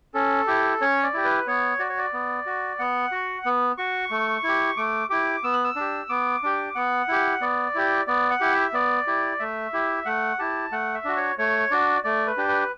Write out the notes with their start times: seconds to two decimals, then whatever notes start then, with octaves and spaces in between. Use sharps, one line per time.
0.14 C#4 A4
0.47 E4 G4
0.81 C#4 C#5
1.03 D5
1.14 E4 G4
1.24 B4
1.47 B3 C#5
1.79 F#4 D5
1.89 C#5
1.98 D5
2.13 B3
2.46 F#4
2.79 B3 F#5
3.12 F#4
3.46 B3
3.78 F#4 C#6
4.11 A3
4.44 E4 G4
4.77 A3 D6
5.10 E4 G4 D6
5.44 B3 E6
5.53 F#6
5.64 E6
5.76 D4 G4
6.09 B3 D6
6.43 D4 G4
6.75 B3 F#5
7.08 E4 G4
7.41 B3 D5
7.75 E4 G4
8.07 B3 D5
8.30 F#5
8.41 E4 G4
8.52 E5
8.73 B3 D5
9.07 E4 G4
9.39 A3 E5
9.73 E4 G4
10.06 A3 F#5
10.39 E4 G4 A5
10.72 A3 F#5
10.95 E5
11.05 D4 F#4
11.17 C#5
11.38 A3 C#5
11.71 D4 F#4 D5
12.04 A3 D5
12.27 B4
12.37 D4 G4
12.48 B4